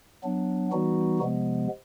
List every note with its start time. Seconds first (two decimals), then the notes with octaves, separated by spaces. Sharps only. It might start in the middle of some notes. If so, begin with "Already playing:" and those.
0.23 F#3 B3 D4
0.72 E3 G3 B3 D#4 F#4
1.19 C3 F3 G#3 B3